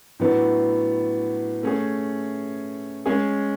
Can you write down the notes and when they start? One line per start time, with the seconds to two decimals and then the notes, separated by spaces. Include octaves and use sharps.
0.20 A2 F#3 B3 D4
1.63 A3 C#4 G#4
3.06 G#3 C#4 G#4